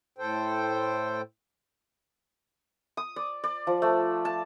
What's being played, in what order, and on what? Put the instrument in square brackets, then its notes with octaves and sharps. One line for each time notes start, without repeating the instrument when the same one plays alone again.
[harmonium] A2 A4 C5 G5
[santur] D#6
D5
D5
F3
A3
A5